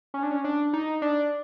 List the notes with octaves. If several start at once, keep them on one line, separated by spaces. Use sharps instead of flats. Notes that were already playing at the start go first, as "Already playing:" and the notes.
C#4
D4
C#4
D4
D#4
D4